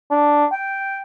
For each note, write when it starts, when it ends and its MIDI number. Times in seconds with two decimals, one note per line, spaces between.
0.11 0.45 62
0.52 1.02 79